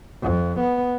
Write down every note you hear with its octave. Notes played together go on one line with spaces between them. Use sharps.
F2
B3